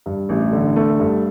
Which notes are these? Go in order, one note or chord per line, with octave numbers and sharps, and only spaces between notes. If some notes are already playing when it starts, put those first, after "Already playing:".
G2
A1
D3
A3
G2